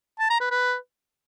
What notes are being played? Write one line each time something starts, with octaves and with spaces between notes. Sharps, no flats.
A5
A#5
B4
B4